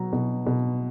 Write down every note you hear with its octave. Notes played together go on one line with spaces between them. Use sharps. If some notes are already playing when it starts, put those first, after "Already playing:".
Already playing: B2 F#3 A#5
B2
B2